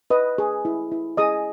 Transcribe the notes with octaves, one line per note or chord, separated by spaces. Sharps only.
B4 D#5 D#6
G#4
E4
E4
G#4 D#5 D#6